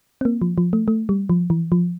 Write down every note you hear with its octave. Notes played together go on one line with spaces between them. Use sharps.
C4
A#3
F3
F3
A3
A3
G3
F3
E3
F3